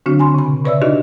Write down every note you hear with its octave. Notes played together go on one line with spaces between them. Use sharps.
D3 F#3 C4 D4 F#4
G#5 B5 C6
C#3 B5
B2
C#3 B4 C#5 D5 E5 E6
D4 D#4 F#4 G4 B4 D#5